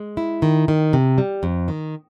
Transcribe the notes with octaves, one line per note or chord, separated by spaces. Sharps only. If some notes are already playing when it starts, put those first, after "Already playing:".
Already playing: G#3
E4
D#3
D#3
C3
G3
F2
D#3